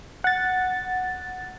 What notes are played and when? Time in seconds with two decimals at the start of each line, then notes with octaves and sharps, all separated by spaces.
0.24 F#5 A6